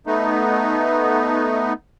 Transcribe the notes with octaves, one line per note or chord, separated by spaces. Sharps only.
A3 B3 D#4